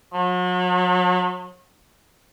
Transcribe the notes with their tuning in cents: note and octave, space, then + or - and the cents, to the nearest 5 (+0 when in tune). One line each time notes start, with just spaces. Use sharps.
F#3 -40